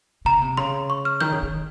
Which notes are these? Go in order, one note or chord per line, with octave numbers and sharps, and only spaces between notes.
C#3 A#5
C3
C#3 C6
C#6
F6
D#3 G6
C#3
D#3